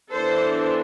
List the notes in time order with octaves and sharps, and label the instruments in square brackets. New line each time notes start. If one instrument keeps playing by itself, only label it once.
[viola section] E3 B3 D4 A4 C5